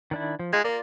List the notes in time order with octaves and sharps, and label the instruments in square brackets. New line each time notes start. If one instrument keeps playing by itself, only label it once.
[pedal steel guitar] D#3 D4 E4
F3
[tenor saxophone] G#3 [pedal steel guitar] D#4 F4 G#5
[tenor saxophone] A#3 [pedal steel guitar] F4 D5